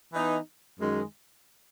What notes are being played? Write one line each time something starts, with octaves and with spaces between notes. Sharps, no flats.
E3 B3 D#4
F#2 D#3 G#3